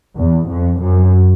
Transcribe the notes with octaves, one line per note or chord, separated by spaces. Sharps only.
E2
F2
F#2